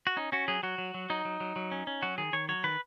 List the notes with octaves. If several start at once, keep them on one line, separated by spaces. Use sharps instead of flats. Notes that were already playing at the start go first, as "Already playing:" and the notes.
F#4
C#4 D#4
C#4 F#4
F#3 G#4
F#3 F#4
F#3
F#3
F#3 D#4
F#3
F#3
F#3
C#4
C#4
F#3 F#4
D#3 G#4
D#3 C#5
F#3 C#5
D#3 B4